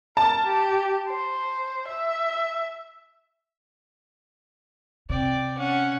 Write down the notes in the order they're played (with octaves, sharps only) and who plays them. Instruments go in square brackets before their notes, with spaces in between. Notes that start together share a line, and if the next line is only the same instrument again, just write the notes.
[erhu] A#4 [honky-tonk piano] A5
[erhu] G4
C5
E5
[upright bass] C3 [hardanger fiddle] D5 G5
[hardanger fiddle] C#4 F#5